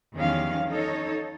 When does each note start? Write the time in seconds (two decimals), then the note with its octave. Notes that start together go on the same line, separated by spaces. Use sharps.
0.15 E2 D#3 F3 G3 C#4 F5
0.69 D#4 A4 C#5